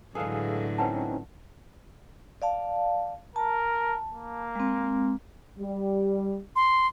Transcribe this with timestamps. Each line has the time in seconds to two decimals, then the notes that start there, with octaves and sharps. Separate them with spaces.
0.15 A2 D3 E3 F#3 G#3 G#4 A4 F5
0.78 C4 C#4 D#4 B4 F#5 A5
2.42 D5 F5 A5
3.36 A#4 A5
4.13 A#3
4.55 G#3 C4
5.59 G3
6.56 C6